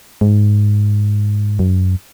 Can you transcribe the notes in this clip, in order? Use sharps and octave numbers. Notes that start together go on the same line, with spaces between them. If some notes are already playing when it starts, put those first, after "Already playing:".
G#2
F#2